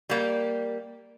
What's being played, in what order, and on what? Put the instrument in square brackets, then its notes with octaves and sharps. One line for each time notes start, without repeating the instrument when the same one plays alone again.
[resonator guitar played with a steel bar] G3 A#3